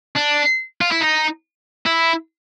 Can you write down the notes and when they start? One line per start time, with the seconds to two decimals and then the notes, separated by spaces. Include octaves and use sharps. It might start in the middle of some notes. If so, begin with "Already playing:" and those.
0.16 D4
0.81 F4
0.91 E4
1.00 D#4
1.86 E4